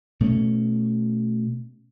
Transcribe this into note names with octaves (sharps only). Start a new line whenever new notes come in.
B2 A3 A#3 C#4